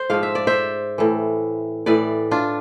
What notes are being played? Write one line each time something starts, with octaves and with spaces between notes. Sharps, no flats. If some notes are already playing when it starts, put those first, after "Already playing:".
Already playing: C5
G#2 F3 F5
E5
D5
C5 E5
A2 E3
A2 E3 B4 D5
D4 F4